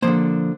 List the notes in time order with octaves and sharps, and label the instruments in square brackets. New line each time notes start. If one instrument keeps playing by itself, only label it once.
[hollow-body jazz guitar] D3 F3 A#3 C5